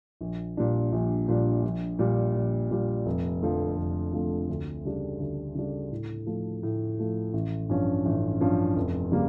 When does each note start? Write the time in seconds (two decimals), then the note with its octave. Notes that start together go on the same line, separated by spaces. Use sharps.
0.21 A#1
0.57 A#2 G3 D4
0.93 A#1
1.28 A#2 G3 D4
1.64 A#1
1.99 A#2 G3
2.34 A#1
2.71 A#2 G3
3.06 F1
3.42 F2 D3 F3 A3
3.77 F1
4.13 F2 D3 F3 A3
4.49 D2
4.85 C#3 G3 D4
5.20 D2
5.55 C#3 G3 D4
5.91 A2
6.26 F3 A3
6.63 A2
6.99 F3 A3
7.33 A1
7.69 G2 F3 C#4
8.05 A1
8.40 G2 F3 C#4
8.76 F1
9.12 C#3 G3 A#3